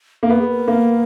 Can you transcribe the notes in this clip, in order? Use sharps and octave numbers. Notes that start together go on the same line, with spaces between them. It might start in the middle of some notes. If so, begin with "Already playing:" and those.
A#3
B3 A#4
G#4
A#4
A#3